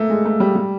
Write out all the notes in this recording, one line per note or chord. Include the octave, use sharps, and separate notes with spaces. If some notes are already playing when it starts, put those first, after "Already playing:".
Already playing: A3 A#3
G#3
A3
G3
G3